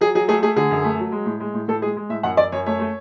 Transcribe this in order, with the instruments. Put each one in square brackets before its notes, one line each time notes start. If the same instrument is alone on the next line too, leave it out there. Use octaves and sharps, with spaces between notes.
[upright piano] F#3 G#4
F#3 G#4
A3 G#4
A3 G#4
D3 G#4
F#2
A3
F#3
G#3
A2
G#3
A2
A2 A4
G#3 G#4
G#3
A2 E5
F#2 F#5
F#2 D5
F#2 C#5
A3 C#5
A3